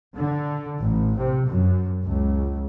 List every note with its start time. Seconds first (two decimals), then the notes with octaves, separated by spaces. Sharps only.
0.17 D3
0.82 A1
1.19 C3
1.48 F#2
2.06 C#2